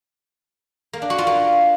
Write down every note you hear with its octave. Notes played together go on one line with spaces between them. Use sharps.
A#3
D4
F#4
F4
A#3